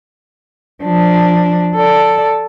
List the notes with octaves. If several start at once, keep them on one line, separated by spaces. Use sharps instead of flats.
F3 D4
A4 D5